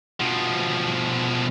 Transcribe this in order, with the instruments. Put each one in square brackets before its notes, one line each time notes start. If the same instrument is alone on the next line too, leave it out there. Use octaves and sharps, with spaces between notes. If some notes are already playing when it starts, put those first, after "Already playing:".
[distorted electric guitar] B2 F3